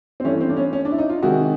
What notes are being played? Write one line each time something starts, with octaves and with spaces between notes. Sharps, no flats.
C4
G2 E3 A3 C#4
C4
D4
C#4
C#4
D4
E4
D#4
F4
C3 D#3 G#3 F#4